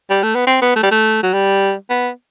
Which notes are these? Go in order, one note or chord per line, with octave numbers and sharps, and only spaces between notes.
G3
A3
B3
C4
B3
A3
G3
A3
F#3
G3
B3